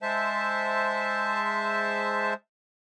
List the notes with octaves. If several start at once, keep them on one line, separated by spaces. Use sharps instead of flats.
G#3 C5 E5 A5